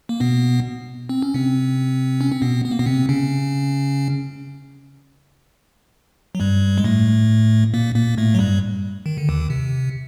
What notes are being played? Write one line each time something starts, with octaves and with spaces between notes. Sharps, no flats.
A#3
B2 B3
C4
C#4
C3 C4
C#4
C4
B2 B3
B3
A#3
B2 B3
C3 C4
C#3 C#4
F#3
G2 G3
G#3
A2 A3
A#2 A#3
A#2 A#3
A2 A3
F#3
G2 G3
D#3
D3
D#2 D#3
C3